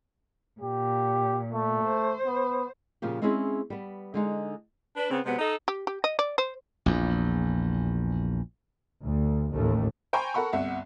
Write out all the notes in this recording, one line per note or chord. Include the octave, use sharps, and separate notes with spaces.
A#2 G4
A3
C5
B3
A#2 C#3 F3 G4
G#3 C4 C#4 E4 G#4
G3 B3
D3 G#3 D#4
D4 B4
C#3 B3 C4
C3 F#3 G#3 B3
D#4 A4 D#5
G4
G4
D#5
D5
C5
A#1 E2
D2
A1 D#2 A3
C5 G5 G#5 A#5 B5 C#6
A4 A#4 F#5 B5 C#6
G1 C2 E5 F#5